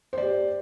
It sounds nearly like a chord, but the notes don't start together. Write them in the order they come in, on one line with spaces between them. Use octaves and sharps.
C5 D5 G4